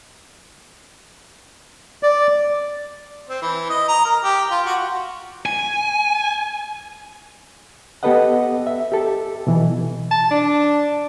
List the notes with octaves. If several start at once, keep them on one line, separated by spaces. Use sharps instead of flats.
D5
C4
E3
D#5
A#5
A#4
G4
F4
F#4
G#5
B3 G4 A4 B4 D#5 F#5
E5
G4 A4
B2 E3
A5
D4